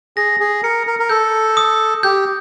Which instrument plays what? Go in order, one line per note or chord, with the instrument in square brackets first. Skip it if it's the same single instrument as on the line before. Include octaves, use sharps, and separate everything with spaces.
[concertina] G#4 [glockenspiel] A#6
[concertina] G#4
[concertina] A#4 [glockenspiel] C#7
[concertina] A#4
A#4
[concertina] A4 [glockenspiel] G6
[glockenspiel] D#6
[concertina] G4 [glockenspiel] G6